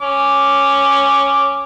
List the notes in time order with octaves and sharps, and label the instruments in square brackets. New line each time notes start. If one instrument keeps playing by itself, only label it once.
[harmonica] C#4 D6